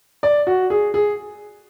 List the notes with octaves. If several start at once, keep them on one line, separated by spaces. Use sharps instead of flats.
D5
F#4
G#4
G#4